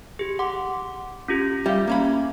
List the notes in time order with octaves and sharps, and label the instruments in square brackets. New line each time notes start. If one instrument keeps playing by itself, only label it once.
[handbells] G4 G#4
F#5 C6 D6
C#4 F4 G4
[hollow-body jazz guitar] G3 G4 [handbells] E5 F5
[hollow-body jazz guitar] A#3 C#4 B5